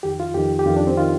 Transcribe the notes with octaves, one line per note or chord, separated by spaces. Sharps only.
F2 D#3 G4
F4
F2 D#3 G4
G4
F2 D#3 F4
D4
C4
D#3 F4